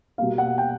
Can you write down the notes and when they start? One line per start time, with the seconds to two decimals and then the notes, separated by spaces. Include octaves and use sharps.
0.18 B2 G3 A#3 F5
0.38 F#5
0.58 G5